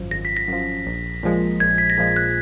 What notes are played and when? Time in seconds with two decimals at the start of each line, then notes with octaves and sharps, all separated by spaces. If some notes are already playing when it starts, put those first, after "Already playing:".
Already playing: G#1 F#2 F3
0.11 G#1 A#6
0.25 B6
0.37 A#6
0.48 F#2 F3
0.86 A#1
1.23 A#2 F3 G#3
1.60 A#1 G#6
1.78 B6
1.90 A#6
1.97 A#2 F3 G#3 G#6
2.16 F#6